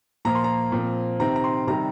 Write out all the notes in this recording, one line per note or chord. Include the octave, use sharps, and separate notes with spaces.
A#2 F3 A#3 A#5
C6
A#5
A#2 F3 C4
C3 D#3 C4 A#5
A#5
C6
C3 D#3 G3 C4 A#5